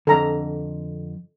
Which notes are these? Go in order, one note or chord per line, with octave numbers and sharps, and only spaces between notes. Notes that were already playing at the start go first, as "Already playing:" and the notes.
F2 D3 A4 A#5